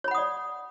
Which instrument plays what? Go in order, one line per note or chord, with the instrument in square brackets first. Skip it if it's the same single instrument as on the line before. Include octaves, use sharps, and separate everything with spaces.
[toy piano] C#5
B5
F#5
D#6
D5